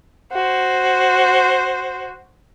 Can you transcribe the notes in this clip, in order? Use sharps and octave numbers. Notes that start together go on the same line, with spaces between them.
F#4 C5